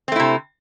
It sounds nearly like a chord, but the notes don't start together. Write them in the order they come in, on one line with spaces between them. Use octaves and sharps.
C4 A3 E4 C3